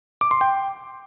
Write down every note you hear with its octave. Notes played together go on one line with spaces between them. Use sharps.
D6
C6
G5